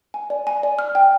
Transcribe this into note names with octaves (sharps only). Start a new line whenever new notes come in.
G#5
D5
G#5
D5
F6
G5